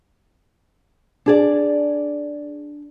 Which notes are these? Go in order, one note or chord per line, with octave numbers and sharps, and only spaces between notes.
D4 G#4 D5